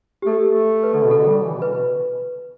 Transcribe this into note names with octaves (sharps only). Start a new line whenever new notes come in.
G4
A3 A4
A3
B4
D3 A4
B2
A4
D3
G3
E3
B2
D3 B4
B2